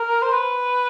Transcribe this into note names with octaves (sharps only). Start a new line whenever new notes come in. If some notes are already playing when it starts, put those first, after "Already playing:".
Already playing: A#4
C5
B4